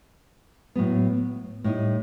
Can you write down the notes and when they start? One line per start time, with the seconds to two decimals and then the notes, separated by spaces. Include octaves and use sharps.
0.75 A2 F#3 B3
1.64 A2 G3 D#4